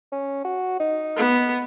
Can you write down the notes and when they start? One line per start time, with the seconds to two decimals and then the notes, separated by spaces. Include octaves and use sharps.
0.12 C#4
0.45 F#4
0.80 D#4
1.16 B3